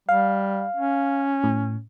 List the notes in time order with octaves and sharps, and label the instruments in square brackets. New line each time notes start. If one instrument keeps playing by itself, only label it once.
[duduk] G3 [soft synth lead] F5
[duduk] C#4
[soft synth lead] A2